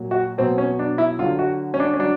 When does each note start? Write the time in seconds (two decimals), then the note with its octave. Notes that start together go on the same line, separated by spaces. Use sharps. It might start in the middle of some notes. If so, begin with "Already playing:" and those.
Already playing: A#2 F#3
0.11 F#4
0.38 B2 F#3 C4
0.58 C#4
0.79 D4
0.98 E4
1.19 D3 F4
1.22 F#3
1.39 F#4
1.74 C#4
1.80 D4
1.93 C#4
1.99 F#3 D4